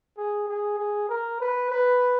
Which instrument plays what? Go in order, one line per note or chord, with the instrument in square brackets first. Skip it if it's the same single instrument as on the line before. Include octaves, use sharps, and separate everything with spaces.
[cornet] G#4
G#4
G#4
A#4
B4
B4